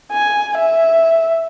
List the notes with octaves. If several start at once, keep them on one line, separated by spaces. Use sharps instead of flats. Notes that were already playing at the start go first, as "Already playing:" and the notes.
G#5
E5